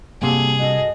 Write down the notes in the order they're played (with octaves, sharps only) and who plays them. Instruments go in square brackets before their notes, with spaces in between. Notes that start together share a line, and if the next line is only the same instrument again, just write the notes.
[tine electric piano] G2 C3 G3 [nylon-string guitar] A#3 F#4 A4 [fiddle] G#4
[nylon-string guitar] F#4 A4 [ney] D#5